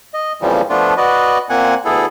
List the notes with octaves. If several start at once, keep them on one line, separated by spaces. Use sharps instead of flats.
D#5
F2 A#2 C#3 E3 F3 G3
F3 A3 B3 D4 F4
F#4 B4 D5 D#5
A#2 A#3 C4 F#5 G#5
D2 B3 E4 G#4 A4